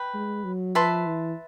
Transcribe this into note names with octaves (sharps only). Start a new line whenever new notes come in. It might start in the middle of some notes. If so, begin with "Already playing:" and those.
Already playing: B4 G5
G#3
F#3
F3 B4 E5 A5 C6
E3